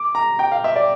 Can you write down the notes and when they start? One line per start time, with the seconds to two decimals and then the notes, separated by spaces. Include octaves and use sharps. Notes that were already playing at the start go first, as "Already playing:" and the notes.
Already playing: D6
0.15 A#5
0.39 G5
0.52 F5
0.64 E5
0.76 D5